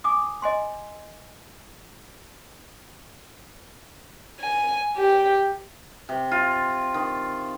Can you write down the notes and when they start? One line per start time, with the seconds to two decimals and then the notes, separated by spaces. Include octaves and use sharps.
0.04 G#5 D6 D#6
0.42 D#5 G#5 C6
4.41 G#5
4.97 G4
6.09 C3
6.31 F4
6.94 D#3